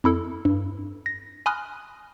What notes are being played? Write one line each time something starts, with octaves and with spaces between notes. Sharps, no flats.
F2 E4 A4
G2
A#6
G#5 B5 C6 D#6 F6 F#6